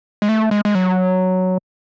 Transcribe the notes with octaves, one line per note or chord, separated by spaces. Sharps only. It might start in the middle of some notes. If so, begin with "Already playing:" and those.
G#3
A3
G#3
G#3
F#3